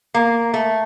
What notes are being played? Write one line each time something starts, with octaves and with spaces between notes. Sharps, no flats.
A#3
A3